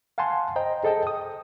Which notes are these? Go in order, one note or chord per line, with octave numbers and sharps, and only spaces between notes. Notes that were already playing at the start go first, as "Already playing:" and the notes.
F5 F#5 G#5 A5 C6
C5 D#5 G5 A#5
G#4 A4 D#5 G5 A5
D#6